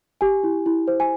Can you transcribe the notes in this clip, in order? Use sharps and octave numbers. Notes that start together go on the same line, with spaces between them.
G4 G#5
E4
E4
C5
G#5